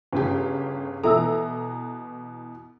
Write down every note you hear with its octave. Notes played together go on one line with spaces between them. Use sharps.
G1 C#3 G4
B2 E3 A4 E5 A#5 E6